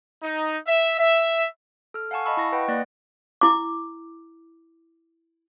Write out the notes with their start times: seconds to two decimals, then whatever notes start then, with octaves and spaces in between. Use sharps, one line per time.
0.22 D#4
0.68 E5
1.00 E5
1.94 A4 F6
2.11 F5 F#5 G#5 A5 C#6
2.25 D#5 F5 A5 B5 C#6 E6
2.37 E4 C#6 A#6
2.52 B4 D#5 F#5 G5
2.68 A#3 D5 F#6 A#6
3.41 E4 D6